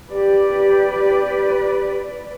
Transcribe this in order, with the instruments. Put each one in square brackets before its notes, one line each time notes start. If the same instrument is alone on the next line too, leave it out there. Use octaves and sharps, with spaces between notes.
[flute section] G4 [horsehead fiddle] B4 D5